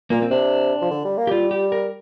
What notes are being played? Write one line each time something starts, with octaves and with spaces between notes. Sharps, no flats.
A#2 A#3
C4
C3 D4
F3
D3
G3
A#3
G4
G3 F4
G4
A#4